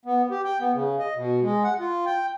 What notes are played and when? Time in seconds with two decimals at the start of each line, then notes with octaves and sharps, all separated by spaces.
0.05 B3
0.31 G4
0.44 G5
0.60 B3
0.74 C#3
0.99 D#5
1.15 B2
1.42 G#3
1.64 F#5
1.80 F4
2.06 G5